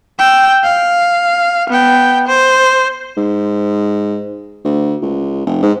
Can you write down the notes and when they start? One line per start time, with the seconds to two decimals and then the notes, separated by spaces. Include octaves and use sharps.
0.19 G5 E6
0.64 F5
1.70 B3 G5
2.28 C5
3.17 G#2
4.65 D2
5.02 C#2
5.46 F1
5.62 G#2